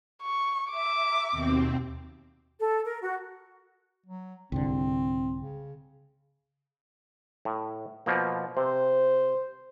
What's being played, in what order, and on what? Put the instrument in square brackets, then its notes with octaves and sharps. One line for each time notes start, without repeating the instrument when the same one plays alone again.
[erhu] C#6
[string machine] E5 [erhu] D6
[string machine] D#2 B2 C4
[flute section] A4
A#4
F#4
[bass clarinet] F#3
[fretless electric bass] C2 G#2 D3 [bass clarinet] C4
[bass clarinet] C#3
[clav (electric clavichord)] A2
B2 F3 A#3
[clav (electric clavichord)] C3 [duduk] C5